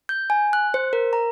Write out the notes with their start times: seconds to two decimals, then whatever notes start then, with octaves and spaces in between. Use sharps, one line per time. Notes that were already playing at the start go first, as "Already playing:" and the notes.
0.09 G6
0.30 G#5
0.53 F#6
0.74 C5
0.93 A#4
1.13 A#5